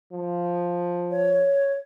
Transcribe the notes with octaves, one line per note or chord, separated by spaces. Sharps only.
F3
C#5